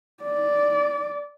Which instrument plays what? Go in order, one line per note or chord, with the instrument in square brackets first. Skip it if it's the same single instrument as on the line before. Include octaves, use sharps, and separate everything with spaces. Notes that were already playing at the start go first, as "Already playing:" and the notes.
[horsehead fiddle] D5